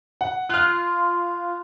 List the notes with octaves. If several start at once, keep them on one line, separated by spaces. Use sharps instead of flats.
F#5
F4 F6 F#6